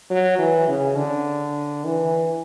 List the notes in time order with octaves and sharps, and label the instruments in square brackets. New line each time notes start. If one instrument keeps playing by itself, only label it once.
[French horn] F#3
E3
C#3
D3
E3